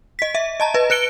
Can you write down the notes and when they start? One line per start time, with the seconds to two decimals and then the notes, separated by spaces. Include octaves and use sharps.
0.19 D#5 B6
0.35 E5
0.60 D#5 A5 A#5
0.74 B4 D#5
0.90 B4 F#6 C#7 D7 G7